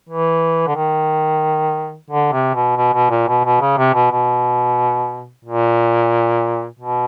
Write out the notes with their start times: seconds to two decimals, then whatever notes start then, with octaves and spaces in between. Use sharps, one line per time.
0.09 E3
0.67 D3
0.76 D#3
2.10 D3
2.32 C3
2.54 B2
2.77 B2
2.94 B2
3.10 A#2
3.27 B2
3.44 B2
3.61 C#3
3.77 C3
3.94 B2
4.11 B2
5.45 A#2
6.79 B2